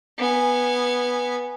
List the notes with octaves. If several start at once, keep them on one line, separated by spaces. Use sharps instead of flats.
B3 G#5